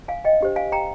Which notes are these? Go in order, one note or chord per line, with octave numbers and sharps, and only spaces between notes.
F5 G#5
D#5 G5
D4 G4 C5
F5 G#5
G5 A#5